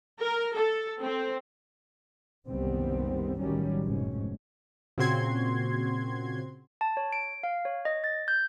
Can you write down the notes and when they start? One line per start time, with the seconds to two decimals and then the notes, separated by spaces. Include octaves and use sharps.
0.20 A#4
0.54 A4
1.02 C4
2.48 F#1 C2 D#3 G3 B3 C4
3.39 A1 D#3 F#3 G3 C#4
3.83 F1 F2 G#2 B2 C#4
4.98 A#2 C#3 C4 F#4 C6 G#6
6.81 A5
6.97 C#5
7.13 D7
7.43 F5
7.65 C#5
7.85 D#5
8.04 A6
8.28 G6